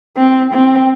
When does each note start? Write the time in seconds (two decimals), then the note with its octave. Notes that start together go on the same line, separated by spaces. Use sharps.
0.17 C4
0.54 C4